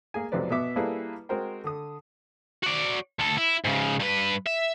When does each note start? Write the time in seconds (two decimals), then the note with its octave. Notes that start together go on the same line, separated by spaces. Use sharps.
0.14 A#3 G#4 G#5
0.32 B1 F2 C3 C4 B4 D5
0.50 B2 B3 E5 D6
0.76 G3 A#3 E4 G#4 A4 B4
1.29 G#3 C4 F#4 A#4 C5 G5
1.64 D3 D#6
2.63 F#4 D5
3.19 D2 A4
3.38 E4
3.65 G#2 C#3
4.00 G2 B4
4.46 E5